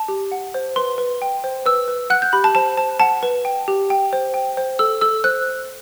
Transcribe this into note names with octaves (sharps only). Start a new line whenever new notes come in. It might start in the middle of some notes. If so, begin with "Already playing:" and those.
Already playing: A5
G4
F#5
C5
B4 C6
B4
G5
C5
B4 E6
B4
F#5 F#6
G6
G4 B5
A5
C5 A5
C5 A5
F#5 A5
B4
G5
G4
G5
C5
G5
C5
A4 E6
A4 E6
C5 F#6